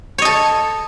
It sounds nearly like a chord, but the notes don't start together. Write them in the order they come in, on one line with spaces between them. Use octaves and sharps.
C#5 D#5 A4